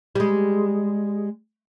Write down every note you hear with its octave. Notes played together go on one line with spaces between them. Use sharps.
G3 G#3